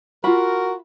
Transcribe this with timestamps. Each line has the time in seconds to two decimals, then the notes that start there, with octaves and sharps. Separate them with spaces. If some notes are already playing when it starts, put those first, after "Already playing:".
0.24 F4 F#4 A#4 B5